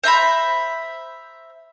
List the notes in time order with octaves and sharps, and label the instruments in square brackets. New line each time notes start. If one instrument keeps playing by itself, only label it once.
[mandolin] C5 E5 A#5 B5